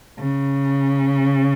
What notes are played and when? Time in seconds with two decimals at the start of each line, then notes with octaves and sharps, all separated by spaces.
0.19 C#3